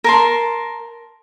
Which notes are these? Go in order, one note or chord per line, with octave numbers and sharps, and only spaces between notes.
A#4 A5 C6